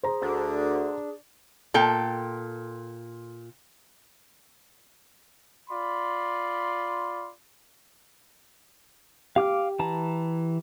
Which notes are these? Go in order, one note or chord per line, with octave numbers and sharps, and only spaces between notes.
G#4 C5 A#5
D2 D3 D4
A#2 A4 G5
F4 D5 B5 C6
G4 F5 D6 F6
E3 A5 A#5